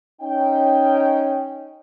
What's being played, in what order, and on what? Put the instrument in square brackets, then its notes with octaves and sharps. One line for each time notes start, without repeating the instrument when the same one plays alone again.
[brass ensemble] C#4 D#4 G5